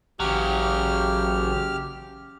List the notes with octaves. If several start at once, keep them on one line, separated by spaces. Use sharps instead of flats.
A1 C#3 F#3 G4 F6